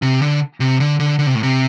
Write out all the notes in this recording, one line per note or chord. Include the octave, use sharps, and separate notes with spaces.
C3
D3
C3
D3
D3
D3
C3
A2
C3